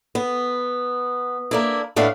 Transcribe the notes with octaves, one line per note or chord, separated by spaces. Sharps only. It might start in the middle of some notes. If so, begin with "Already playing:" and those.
B3
A#3 D4 E4
A2 B3 D4 E5 F5